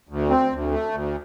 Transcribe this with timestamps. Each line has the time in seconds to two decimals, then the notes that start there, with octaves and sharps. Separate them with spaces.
0.09 D2
0.30 C4
0.51 D2
0.72 A3
0.92 D2